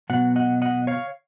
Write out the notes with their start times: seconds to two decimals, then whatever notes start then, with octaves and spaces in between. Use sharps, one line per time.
0.10 B2 F#3 B3 F#5
0.36 D#5 F#5
0.62 D#5 F#5
0.87 C#5 F5